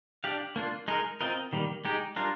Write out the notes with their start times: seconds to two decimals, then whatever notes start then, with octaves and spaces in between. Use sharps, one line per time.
0.24 D4 G4 D5 F5
0.56 A#3 D4 F4
0.88 G#3 D#4 A#4
1.21 C4 F4 A#4 D#5
1.53 D#3 G3 A#3
1.85 G#3 D#4 G4
2.16 G3 D4 F4 A#4